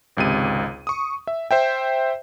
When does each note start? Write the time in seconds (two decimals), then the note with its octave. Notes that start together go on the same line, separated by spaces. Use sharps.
0.17 G#1 C#2 C3 D#7
0.87 C#6 D#6
1.27 E5
1.51 C5 E5 G5